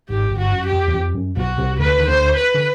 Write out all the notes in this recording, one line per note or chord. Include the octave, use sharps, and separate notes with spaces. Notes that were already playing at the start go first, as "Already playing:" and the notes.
G#1 G#2 G4
G1 G2
F#4
F#2
G4
F2
E2
F2
F#2
B1 B2 F#4
C2 C3
D2 D3 B4
D#3
D2 D3 C5
B4
D3